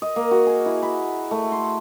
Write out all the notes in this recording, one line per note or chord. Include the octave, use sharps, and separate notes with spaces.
D#5
A#3
F#4
G#4
E4
B5
A3
C6